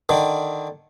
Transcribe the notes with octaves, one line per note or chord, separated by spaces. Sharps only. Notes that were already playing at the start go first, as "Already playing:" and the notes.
D3 D#3